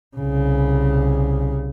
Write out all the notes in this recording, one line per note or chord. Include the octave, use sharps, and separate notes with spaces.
C2 C#3